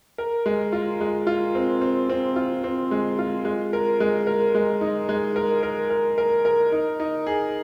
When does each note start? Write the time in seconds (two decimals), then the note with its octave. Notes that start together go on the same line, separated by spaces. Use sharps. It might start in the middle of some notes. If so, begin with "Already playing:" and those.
0.18 A#4
0.46 G#3
0.72 F4
1.01 G#3
1.27 F4
1.55 C4
1.81 C4
2.09 C4
2.36 F4
2.64 C4
2.91 G#3
3.19 F4
3.45 G#3
3.73 A#4
4.00 G#3
4.27 A#4
4.55 G#3
4.81 D#4
5.09 G#3
5.36 A#4
5.63 A#4
5.90 A#4
6.18 A#4
6.45 A#4
6.72 D#4
7.00 D#4
7.27 G#4